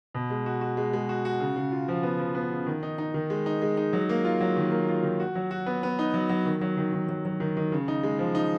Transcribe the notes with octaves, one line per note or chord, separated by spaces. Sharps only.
B2
G#3
F#4
F#4
G#3
G#3
F#4
F#4
C#3
C#3
F4
F3
B3
F3
B3
C#3
D#3
D#4
D#4
D#3
G#3
D#4
G#3
D#4
F#3
A#3
F4
F#3
D#3
A#3
F4
D#3
F#4
F#3
F#4
B3
B3
D#4
F#3
F#3
D#3
F#3
D#3
D#3
F#3
F#3
D#3
D#3
C#3
D#4
G#3
F3
D#4